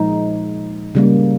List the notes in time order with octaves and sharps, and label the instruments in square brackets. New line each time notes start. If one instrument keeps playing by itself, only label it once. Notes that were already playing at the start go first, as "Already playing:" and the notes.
Already playing: [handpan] A#2 F3 G#3 D#4
C#3 G3 A#3